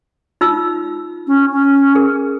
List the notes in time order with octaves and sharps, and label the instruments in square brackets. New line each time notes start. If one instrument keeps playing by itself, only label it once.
[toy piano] D#4 F4 E6
[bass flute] C#4
C#4
[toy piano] G#4 A#4